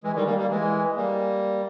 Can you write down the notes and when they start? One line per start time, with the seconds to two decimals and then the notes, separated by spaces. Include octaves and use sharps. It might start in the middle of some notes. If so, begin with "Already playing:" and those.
0.04 E3 G#3
0.15 D#3 G3
0.26 G3 A#3
0.38 G3 A#3
0.50 E3 G#3
0.96 G3 A#3